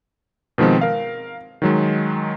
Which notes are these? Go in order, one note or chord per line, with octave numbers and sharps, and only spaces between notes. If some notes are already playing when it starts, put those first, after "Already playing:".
B2 D#3 F3 G#3 C4
A#4 F5
D#3 F#3 G#3